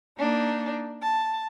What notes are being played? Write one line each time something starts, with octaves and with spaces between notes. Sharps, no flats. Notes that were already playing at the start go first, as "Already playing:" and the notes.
A#3 D4 D#4
A5